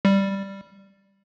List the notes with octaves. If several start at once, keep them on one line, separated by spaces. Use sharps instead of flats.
G3